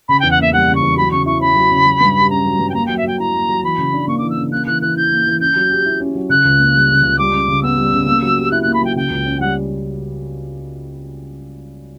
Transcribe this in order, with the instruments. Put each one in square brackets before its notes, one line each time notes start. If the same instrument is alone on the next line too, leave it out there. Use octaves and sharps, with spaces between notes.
[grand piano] C#3 [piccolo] B5
[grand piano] E2 [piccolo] G5
[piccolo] F#5
[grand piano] A#3 [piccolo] E5
[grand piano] G3 [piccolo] F#5
[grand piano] C#3
[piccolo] C#6
[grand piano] E2
[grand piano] F#3 [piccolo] B5
[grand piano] C#3 [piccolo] C#6
[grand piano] E4 [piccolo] C#6
[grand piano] C#4 [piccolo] B5
[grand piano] F#3
C#3
F#3
G2
G4
[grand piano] C#4 [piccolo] A#5
[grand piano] F#3
G2
[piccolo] G5
[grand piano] A#3 [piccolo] A#5
[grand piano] F#3 [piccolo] G5
[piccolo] E5
[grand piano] F#3 [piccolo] G5
[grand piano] E4 [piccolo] A#5
[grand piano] A#3
F#3
[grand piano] E3 [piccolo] B5
[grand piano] C#3
D4
[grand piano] A#3 [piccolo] C#6
[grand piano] E3 [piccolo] D6
[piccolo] E6
[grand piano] C#3
[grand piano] A#3 [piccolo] F#6
[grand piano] E3 [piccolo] F#6
[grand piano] E3 [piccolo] F#6
[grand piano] E4 [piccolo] G6
[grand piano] A#3
E3
[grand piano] C#4 [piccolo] G6
[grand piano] F#3
G4
E4
C#4
F#3
[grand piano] C#3 [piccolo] F#6
[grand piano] C#2
A#3
G3
C#3
C#2
[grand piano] G3 [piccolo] D6
[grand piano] C#3
C#3
[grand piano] B3 [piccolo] E6
[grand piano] G3
C#3
A#3
F#3
G4
[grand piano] E4 [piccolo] F#6
[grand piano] A#3 [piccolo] F#6
[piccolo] B5
[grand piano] F#3 [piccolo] G5
[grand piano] C#3 [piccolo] G5
[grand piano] C#2
C#4
[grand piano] G3 [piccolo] F#5